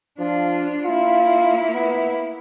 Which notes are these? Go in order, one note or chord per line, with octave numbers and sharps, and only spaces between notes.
F3 D4 F4
A#3 E4 F4
B3